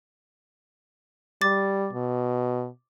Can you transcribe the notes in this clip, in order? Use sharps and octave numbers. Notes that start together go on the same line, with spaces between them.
G3 D6 A6
B2